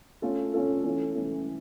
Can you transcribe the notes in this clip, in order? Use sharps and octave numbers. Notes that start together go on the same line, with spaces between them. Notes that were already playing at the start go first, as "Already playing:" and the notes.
A3 C#4 F4 A4
A3 C#4 F4 A4
E3 A3 C#4
E3 A3 C#4